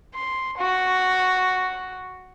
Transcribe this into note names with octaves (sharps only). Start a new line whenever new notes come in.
C6
F#4